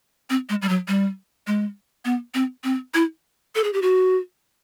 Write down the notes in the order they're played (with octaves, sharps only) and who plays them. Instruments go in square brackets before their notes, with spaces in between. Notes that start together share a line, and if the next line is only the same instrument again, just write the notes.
[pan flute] C4
G#3
G3
F#3
G3
G#3
B3
C4
C4
E4
A4
G#4
G4
F#4